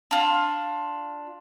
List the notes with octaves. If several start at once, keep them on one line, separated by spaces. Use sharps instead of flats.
D4 F4